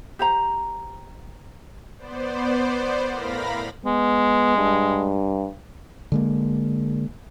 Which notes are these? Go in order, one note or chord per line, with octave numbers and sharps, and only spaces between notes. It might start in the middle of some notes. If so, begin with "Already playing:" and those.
G4 C5 A#5
B3 C5 D5
A2 A#4 F5 B5 A#6
G#3 B3
G2
D3 G#3 A#3